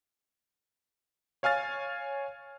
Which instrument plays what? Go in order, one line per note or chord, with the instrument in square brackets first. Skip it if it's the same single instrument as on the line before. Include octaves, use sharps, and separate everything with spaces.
[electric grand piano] C#5 F5 G#5 F6 A6